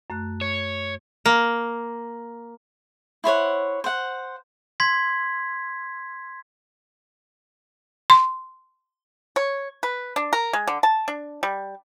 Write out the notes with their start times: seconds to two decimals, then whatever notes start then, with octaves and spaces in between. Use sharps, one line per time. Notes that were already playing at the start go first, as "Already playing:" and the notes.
0.10 F#2 A3 F#6
0.41 C#5
1.26 A#3
3.24 E4 C5 C#5 F#5
3.84 C5 F#5
4.80 C6 G#6 B6
8.10 C6
9.36 C#5
9.83 B4
10.16 D4
10.33 A#4
10.53 G#3
10.68 D3
10.83 A5
11.08 D4
11.43 G3